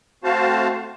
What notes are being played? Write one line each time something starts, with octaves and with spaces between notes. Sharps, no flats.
A3 C4 F#4 C5 F5 A5